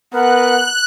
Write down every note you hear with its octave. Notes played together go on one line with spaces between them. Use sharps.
B3 A#4 B4 F#5 F#6